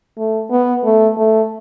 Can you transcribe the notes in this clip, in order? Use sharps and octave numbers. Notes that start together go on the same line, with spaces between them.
A3
B3
A3
A3